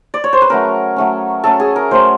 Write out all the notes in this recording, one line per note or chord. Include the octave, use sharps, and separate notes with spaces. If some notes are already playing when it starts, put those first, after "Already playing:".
D5
C#5
C5
B4
F#3 A3 C#4 A#4
F#3 A3 C#4
F#3 A3 C#4 A4
G#4
A#4
F#3 A3 C#4 C5